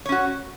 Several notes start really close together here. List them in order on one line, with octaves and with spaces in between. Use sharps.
C#5 C#4 F#4